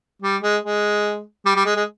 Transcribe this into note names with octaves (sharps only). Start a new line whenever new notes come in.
G3
G#3
G#3
G3
G3
G#3
G#3